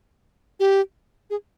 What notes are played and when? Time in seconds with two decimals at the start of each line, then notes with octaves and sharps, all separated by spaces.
0.60 G4
1.30 G#4